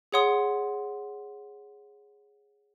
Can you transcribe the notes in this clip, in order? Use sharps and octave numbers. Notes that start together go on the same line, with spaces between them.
G#4 C#5 F#5 C6 D#6